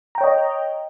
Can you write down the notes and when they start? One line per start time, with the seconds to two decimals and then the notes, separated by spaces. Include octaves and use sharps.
0.15 A#5
0.18 G5
0.21 C#5
0.24 D#5